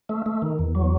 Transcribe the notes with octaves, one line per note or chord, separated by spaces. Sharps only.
A3
A3
D#3
E2
F#3